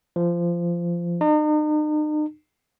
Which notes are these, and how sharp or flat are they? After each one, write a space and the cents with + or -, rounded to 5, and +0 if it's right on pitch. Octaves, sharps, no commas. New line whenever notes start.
F3 -20
D#4 -40